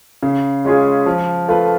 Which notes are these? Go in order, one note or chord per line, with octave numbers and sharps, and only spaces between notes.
C#3
G#3 C#4 F4 G#4
F3
A3 F4 B4